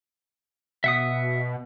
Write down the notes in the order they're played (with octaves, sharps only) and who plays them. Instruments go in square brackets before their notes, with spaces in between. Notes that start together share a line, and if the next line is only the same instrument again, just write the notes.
[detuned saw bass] B2 [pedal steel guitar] E5 F#5 D#6